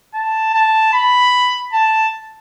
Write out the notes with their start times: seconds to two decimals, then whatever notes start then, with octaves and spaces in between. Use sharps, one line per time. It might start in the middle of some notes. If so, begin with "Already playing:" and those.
0.14 A5
0.53 A5
0.93 B5
1.73 A5